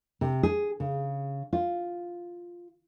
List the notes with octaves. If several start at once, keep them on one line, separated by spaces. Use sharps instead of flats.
C3
G#4
C#3
F4